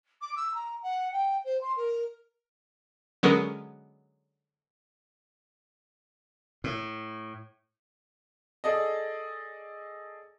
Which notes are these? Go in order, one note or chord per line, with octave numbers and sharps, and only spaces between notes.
D6
E6
A#5
F#5
G5
C5
C6
A#4
D3 F#3 G#3 B3 C#4 A#4
A2
G#4 A4 D5 D#5